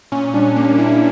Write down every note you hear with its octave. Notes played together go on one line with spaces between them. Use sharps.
A#2 C#4
G3 D4
A#3 D4
A#2 C#4 E4